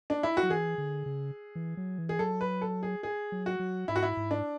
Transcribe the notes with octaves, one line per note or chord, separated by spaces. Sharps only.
D4
E4
F#4
F#3
E3 G#4
D3
C#3
E3
F#3
E3
G#4
F#3 A4
B4
A4
G#4
G#4
F#3
F#4
F#3
G#2 E4
F#4
E4
G#2
D4